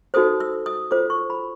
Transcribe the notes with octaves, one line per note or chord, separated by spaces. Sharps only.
D#4 F#4 A4 C5 D#6
E6
D#6
F4 A4 C5 D6
C#6
B5